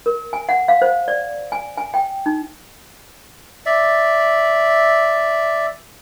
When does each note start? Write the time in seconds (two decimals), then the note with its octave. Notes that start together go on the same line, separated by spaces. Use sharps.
0.06 A#4
0.33 G#5
0.49 F#5
0.68 F5
0.82 C5
1.08 D5
1.52 G#5
1.78 G#5
1.94 G5
2.26 D#4
3.66 D5 E5